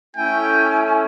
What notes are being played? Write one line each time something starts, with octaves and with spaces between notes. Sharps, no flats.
A3 C#4 E4 G5 G#5